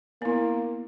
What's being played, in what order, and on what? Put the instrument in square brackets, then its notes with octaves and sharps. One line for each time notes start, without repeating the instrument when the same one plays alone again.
[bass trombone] A#3 [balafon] B3 E4